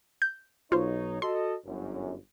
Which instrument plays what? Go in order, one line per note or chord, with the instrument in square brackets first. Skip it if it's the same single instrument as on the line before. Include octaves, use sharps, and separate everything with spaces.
[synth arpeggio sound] G6
[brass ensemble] B1 D#4 C#5 [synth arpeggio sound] F4 C5
[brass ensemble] F#4 A4 D#5 [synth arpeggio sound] C6
[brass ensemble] G1 F#2